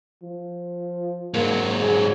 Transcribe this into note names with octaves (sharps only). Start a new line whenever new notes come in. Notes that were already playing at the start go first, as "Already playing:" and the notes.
F3
G#2 F#3 A#3
G#4